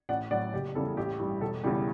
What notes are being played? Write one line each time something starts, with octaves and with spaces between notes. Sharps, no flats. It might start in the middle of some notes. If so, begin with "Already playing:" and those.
A1 D5 F#5
A2 F#3 D5 F#5
F#1 G4
E2 C#3 E3 G3 A4
A1 G4
G2 E3 G3
E1 A4
E2 C#3 E3 G3 G4